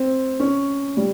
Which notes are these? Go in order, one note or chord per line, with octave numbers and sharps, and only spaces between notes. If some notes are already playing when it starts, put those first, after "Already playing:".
Already playing: C4
C#4
G3